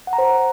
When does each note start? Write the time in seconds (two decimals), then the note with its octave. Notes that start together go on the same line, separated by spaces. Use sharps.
0.07 F#5
0.13 A#5
0.18 C5